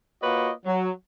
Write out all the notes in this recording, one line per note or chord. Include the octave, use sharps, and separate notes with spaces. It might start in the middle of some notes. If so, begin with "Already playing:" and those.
A#3 F4 F#4 B4 C#5 D#5
F#3